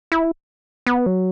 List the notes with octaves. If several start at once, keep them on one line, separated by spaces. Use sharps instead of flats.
E4
B3
F#3